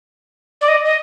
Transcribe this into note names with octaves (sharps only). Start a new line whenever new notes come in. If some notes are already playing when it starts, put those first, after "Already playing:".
D5
D#5
D#5